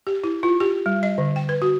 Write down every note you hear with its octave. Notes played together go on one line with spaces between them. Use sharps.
G4
E4
F4
G4
G3
D#5
D3
G5
B4
F#4